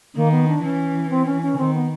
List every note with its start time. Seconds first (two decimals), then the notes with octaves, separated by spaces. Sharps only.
0.16 D#3 A#3
0.31 B3
0.48 D4
0.63 E3 C#4
1.10 C4
1.25 C#4
1.42 C#4
1.57 D#3 C4
1.74 B3